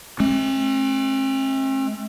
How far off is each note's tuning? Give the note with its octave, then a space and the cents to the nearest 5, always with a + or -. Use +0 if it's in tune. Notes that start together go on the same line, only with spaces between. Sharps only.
A3 -40 C4 +45